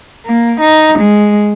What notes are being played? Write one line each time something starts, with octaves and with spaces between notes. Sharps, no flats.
A#3
D#4
G#3